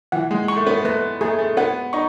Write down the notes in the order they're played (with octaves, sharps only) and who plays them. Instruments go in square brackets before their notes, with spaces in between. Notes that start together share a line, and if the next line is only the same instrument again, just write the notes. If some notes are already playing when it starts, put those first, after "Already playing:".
[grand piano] E3 [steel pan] F#5
[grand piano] G#3
[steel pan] C#6
[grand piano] A3
B3
[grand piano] A3 [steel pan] B4
[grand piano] A3 [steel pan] G#4
[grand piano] A3
[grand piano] B3 [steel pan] F#5
[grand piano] D#4 [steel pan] C#6